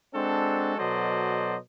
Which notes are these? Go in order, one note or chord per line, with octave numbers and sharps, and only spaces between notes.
G#3 C4 D4 F#4 A4
B2 F#3 A4 C5 D5 D#5